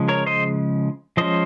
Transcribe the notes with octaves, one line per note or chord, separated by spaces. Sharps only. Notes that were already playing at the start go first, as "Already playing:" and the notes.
Already playing: C#3 F3 G#3
A#4 C#5
C5 D#5
F3 G#3 C#4 C5 D#5